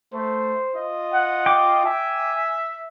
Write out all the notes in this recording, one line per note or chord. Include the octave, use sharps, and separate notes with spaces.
A3 C5
F4 D#5
F#5
G5 D6
E5 G#5